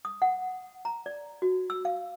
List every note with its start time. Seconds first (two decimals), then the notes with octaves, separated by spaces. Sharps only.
0.05 D#6
0.22 F#5
0.85 A#5
1.06 D5
1.42 F#4
1.70 E6
1.85 F5